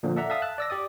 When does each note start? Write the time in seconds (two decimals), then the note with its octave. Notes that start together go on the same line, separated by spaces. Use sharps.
0.03 A#2 D3 F3
0.16 A4 D5 E5 F#5 A#5
0.30 E5 F5 A5 D#6 E6
0.42 A5 F#6
0.58 D5 E6 A#6
0.70 G4 D5 D#6